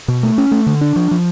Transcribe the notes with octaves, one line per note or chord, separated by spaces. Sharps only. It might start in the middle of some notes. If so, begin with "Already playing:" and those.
B2
A3
C#4
A3
D3
D4
F3
F3